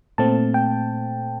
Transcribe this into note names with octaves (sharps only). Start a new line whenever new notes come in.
A#2 A3 C4 A5
G5